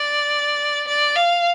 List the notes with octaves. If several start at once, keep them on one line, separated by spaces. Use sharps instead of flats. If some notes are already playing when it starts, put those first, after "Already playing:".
Already playing: D5
D5
F5